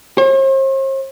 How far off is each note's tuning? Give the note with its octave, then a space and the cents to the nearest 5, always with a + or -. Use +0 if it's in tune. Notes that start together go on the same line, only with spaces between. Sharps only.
C5 +45